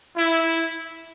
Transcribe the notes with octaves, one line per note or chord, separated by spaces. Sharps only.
E4